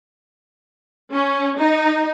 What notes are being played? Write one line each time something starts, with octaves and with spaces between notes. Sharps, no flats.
C#4
D#4